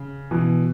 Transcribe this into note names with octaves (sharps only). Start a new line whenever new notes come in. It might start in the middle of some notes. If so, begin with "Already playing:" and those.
Already playing: C#3
B2 E3